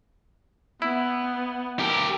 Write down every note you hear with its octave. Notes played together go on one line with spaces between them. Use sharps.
B3 E4
G4 A#4